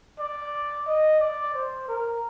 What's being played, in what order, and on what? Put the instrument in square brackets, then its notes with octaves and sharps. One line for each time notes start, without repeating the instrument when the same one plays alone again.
[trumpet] D5
D#5
D5
C5
A#4